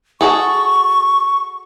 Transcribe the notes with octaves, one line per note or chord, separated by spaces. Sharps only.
F#4 G#4 A4 C#6